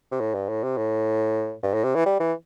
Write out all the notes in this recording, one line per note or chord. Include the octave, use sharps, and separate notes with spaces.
C3
A2
G2
A2
C3
A2
G2
A2
C3
E3
G3
E3